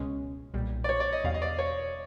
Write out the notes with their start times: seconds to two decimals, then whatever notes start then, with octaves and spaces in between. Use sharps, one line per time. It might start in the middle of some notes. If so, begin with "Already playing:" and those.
Already playing: C#2 B2 G#3 C#4
0.54 B1 A#2 G3
0.84 D5
0.89 C#5
1.00 D5
1.13 D#5
1.24 E2 B2 G3 F5
1.34 D#5
1.42 D5
1.59 C#5